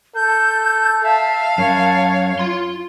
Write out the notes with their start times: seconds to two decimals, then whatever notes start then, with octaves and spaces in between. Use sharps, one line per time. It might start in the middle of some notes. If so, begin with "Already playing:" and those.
0.15 A4 G6
1.04 E5 F5 A5
1.58 F#2 C#5
2.39 F4 C6